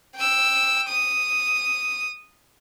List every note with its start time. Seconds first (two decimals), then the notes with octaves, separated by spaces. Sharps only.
0.15 G5 E6
0.88 D#6